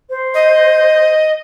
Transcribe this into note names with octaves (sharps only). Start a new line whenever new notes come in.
C5
D#5